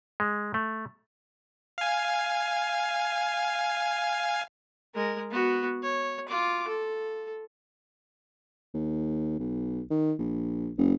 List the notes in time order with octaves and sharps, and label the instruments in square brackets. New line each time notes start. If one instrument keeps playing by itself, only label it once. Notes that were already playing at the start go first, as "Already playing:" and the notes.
[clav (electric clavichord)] G#3
A3
[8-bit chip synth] F5 G#5
[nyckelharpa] G#3 A#4
B3 F#4
C#5
F4 D6
A4
[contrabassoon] D#2
B1
D#3
A#1
F#1